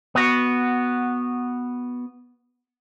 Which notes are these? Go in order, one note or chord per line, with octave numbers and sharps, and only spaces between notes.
B3 F#4